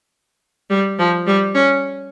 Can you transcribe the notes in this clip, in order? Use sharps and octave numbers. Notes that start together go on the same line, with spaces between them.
G3
F3
G3
C#4